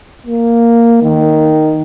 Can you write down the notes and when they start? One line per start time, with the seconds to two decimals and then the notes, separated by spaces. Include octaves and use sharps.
0.26 A#3
1.02 D#3